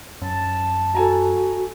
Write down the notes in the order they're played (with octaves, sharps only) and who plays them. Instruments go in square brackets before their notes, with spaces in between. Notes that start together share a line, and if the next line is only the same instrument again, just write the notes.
[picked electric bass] F#2 [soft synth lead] A5
[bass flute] F#4 [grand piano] A4 G#5 A#5